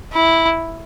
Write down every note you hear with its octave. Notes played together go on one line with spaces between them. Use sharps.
E4